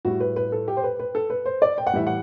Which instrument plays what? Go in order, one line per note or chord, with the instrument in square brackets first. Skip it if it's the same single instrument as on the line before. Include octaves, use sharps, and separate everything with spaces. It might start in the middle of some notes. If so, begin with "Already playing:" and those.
[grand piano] A2 G3 F#4
B4
B4
A4
G4
C5
B4
B4
A4
B4
C5
D5
G5
F#5
A2 E3 G3 E5
F#5